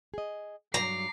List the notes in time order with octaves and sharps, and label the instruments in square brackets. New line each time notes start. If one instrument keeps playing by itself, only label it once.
[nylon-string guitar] G#4 D#5
[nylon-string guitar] G2 F#3 [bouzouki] A#5 [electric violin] D6 C7